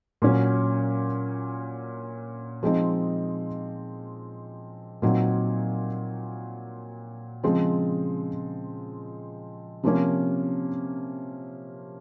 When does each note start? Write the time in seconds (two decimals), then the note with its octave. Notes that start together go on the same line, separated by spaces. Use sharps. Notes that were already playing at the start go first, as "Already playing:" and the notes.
0.22 A#2 F#3 C#4
2.63 F3 G#3 C4 D#4
5.02 A#2 F#3 C4 D#4
7.43 C#3 F3 G#3 C4
9.83 C3 F3 A#3 C#4